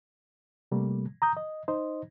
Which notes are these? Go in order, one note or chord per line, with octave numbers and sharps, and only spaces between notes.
C3 G3 A3 A#3
A#5 D#6 G6
D#5
D#4 C5 D#5